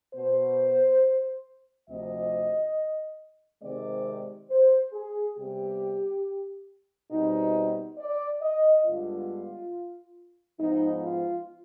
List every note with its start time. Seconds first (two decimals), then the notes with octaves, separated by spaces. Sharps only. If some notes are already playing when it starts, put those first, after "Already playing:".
0.14 B2 B3 C5
1.88 D2 C3 F3 C4 D#5
3.63 C3 D#3 G#3 C4 D5
4.50 C5
4.92 G#4
5.36 C3 G3 B3 G4
7.11 B2 G3 C4 D#4
7.98 D5
8.41 D#5
8.85 G2 D3 G#3 B3 F4
10.59 G#2 F3 B3 D#4
11.03 F4